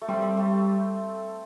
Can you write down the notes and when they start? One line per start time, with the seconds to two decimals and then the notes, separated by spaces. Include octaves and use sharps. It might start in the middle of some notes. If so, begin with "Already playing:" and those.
0.02 A3
0.08 G3 C4
0.22 C4
0.37 A3